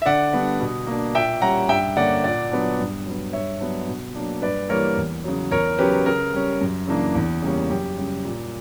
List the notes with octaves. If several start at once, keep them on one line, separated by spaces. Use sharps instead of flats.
E5
D3 D5 F#5
G3 B3 D4
B2
A#3 D4
A#2 E5 G5
G3 C#4 F#5 A#5
G2 E5 G5
D3 A#3 C#4 D5 F#5
A#2 D5 F#5
F#3 B3 D4
G2
F#3 B3
G2 C#5 E5
F#3 B3 D4
B2
F#3 A#3 D4
G2 B4 D5
E3 G3 A#3 A#4 C#5
E2
C#3 F#3
E2 A#4 C#5
C#3 F#3 C#4 G4 B4
C#3 A#4
G3 C#4
F#2
C#3 E3 A#3 D4
E2
C#3 G3 A#3 C#4
F#2 G4
C#3 G3
A#2